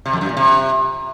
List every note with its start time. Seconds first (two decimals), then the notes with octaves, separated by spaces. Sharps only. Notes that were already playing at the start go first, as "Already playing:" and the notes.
0.06 C3
0.13 F2
0.21 F#2
0.29 A#2
0.37 C3